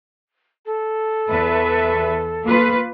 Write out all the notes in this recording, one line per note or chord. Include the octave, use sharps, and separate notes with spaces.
A4
E2 B4 E5
A#3 F4 B4